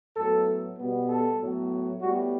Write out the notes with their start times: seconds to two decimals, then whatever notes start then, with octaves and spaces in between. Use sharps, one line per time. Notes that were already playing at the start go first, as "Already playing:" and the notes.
0.16 A2 F#3 B3 A4
0.77 B2 G3 B3
1.09 A4
1.39 A2 F#3 B3
2.01 A2 G3 B3 F#4